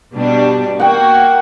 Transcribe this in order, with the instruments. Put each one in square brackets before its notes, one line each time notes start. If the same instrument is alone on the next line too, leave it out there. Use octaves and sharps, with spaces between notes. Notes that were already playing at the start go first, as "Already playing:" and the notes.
[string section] B2 G3 D4
[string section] A#3 F#4 [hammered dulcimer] F#5 G5